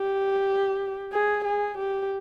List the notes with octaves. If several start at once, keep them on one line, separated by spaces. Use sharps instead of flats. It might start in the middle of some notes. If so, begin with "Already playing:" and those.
Already playing: G4
G#4
G#4
G4